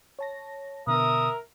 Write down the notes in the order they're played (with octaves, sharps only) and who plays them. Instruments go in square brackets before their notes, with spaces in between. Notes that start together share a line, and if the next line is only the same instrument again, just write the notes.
[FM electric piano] C#5 A5 A#6
[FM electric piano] B2 D3 B3 [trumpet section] A#4 E5 [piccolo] D#6